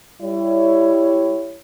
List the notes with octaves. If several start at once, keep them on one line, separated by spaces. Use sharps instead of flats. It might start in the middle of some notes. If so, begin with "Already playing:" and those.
G3 E4 C#5